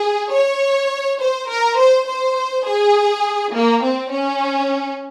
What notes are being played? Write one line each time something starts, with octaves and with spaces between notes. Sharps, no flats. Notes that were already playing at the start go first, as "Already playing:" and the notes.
Already playing: G#4
C#5
C5
A#4
C5
C5
G#4
A#3
C4
C#4